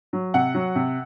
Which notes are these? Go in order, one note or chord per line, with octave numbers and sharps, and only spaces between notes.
F#3
C3 F#5
F#3
C3